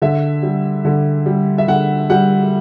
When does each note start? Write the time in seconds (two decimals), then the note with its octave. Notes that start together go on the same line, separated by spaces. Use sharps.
0.02 D3 E5
0.42 G3
0.85 D3
1.26 G3
1.58 E5
1.67 D3 F#5
2.10 G3 F#5